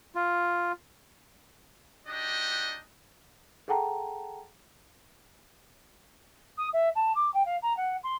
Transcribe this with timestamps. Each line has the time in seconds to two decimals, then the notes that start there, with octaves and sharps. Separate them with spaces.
0.15 F4
2.06 D4 D#4 F#4 G4 D#5
3.68 G#4 A4 F#5 G5 A5 A#5
6.57 D#6
6.72 E5
6.95 A5
7.15 D6
7.34 G5
7.45 F5
7.62 A#5
7.76 F#5
8.03 C6